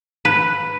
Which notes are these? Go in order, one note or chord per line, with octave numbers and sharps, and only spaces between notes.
B4